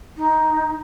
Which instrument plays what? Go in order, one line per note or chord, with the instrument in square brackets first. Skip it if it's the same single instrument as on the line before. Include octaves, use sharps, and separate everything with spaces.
[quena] D#4